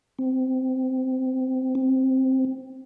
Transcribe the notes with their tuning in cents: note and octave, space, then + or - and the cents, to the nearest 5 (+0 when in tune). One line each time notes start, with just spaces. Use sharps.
C4 -15
C4 +5